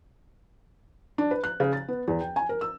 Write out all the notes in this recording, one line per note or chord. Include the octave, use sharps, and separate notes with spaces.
D4
B4
F#6
C#3
A6
B3
E2
G5
G#5
A#4
E6